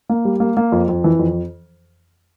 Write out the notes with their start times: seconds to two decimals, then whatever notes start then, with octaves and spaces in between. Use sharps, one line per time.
0.09 A#3
0.25 G3
0.40 A#3
0.57 A#3
0.72 F2
0.88 F2
1.04 E3
1.19 F2